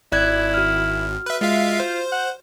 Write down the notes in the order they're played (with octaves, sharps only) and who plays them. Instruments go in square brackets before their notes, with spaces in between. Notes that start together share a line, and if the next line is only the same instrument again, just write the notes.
[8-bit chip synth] G#1 [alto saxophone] E4 [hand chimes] D5 F#6 G#6
[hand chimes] F#4 F6
[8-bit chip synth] B4 E5
[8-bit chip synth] G#3 E5 F5 [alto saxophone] F4
[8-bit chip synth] C5
[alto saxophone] F#5